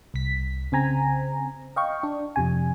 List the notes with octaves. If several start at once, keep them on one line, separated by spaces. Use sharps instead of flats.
C2 B6
C#3 C4 G#5 A#5
D#5 F5 G5 C#6
D4
F2 C3 G#5